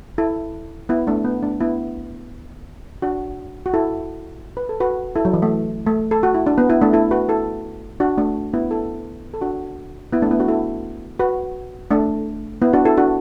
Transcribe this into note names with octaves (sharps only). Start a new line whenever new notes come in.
E4 A4
B3 E4
A3 D4
B3
A3 D4
B3 E4
D4 F#4
F#4
E4 A4
B4
A4
F#4 B4
E4 A4
F#3
E3
A3
A3
A4
F#4
E4
D4
B3
B3 E4
A3 D4
E4 A4
F#4 B4
E4 A4
D4 F#4
A3 D4
B3 E4
E4 A4
A4
D4 F#4
B3 E4
A3 D4
B3 E4
D4 F#4
E4 A4
F#4 B4
A3 D4
B3 E4
D4 F#4
E4 A4
D4 F#4